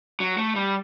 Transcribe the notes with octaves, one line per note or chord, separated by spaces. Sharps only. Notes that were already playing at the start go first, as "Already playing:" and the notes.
F#3
A3
G3